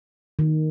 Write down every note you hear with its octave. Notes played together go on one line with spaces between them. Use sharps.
D#3